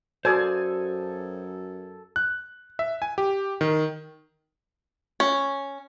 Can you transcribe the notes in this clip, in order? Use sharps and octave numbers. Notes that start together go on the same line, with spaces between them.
F#2 F#4 A4 C5 D5 G#5 D#6
F#6
E5
G#5
G4
D#3
C#4